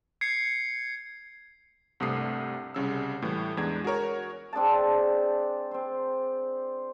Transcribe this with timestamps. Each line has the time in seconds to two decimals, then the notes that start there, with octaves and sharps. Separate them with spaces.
0.21 G#6 C7 C#7
2.00 C2 G2 C3 A3 D#6 C7
2.74 C2 C#3 E6
3.22 A2 E3 G3 A3
3.57 E2 G#3 D4 G#6
3.84 F#4 G#4 A#4 C#5
4.53 C4 D4 G#4 A5
5.71 C4 C5